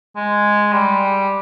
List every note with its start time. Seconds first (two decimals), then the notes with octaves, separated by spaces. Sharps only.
0.16 G#3
0.72 G3